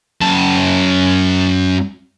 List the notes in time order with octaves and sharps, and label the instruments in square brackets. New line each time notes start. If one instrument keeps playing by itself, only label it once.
[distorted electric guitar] F#2 A5